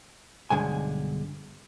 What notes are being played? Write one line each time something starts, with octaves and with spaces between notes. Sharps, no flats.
B1 G2 D3 G#3 G#5